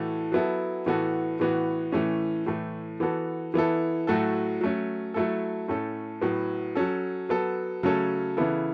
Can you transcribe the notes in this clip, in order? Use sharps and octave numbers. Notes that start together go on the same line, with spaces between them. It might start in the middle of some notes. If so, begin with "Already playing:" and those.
Already playing: A2 E3 A3 F#4 A4
F#3 B3 E4 A4
A2 E3 B3 F#4 A4
A2 E3 B3 F#4
A2 E3 A3 C#4
A2 E3 A3
E3 B3 F#4 A4
E3 B3 E4 A4
A2 F#3 A3 F#4 A4
F#3 A3 C#4
F#3 A3 E4 A4
A2 A3 C#4 A4
A2 F#3 B3
F#3 C#4 A4
F#3 B3 A4
C#3 F#3 A3 C#4 A4
C#3 E3 B3 E4 A4